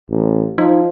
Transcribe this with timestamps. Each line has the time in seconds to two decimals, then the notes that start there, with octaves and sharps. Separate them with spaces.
0.10 A1
0.58 F3 D#4